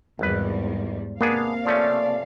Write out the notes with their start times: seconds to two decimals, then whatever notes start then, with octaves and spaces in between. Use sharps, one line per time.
0.19 G#1 E2 G#2 G3 B4
1.21 C3 A#3 B3 D4 G#4 F5
1.66 F3 A3 C#4 D5